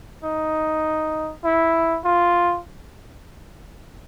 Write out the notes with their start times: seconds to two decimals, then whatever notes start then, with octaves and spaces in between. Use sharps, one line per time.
0.24 D#4
1.44 E4
2.04 F4